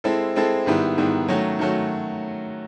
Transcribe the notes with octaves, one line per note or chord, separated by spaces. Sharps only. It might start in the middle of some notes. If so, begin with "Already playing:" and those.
G#3 C4 E4 A4
G#3 C4 E4 A4
G#2 D#3 G3 B3 E4
G#2 D#3 G3 B3 E4
D#3 F#3 A3 C#4 F#4
D#3 F#3 A3 C#4 F#4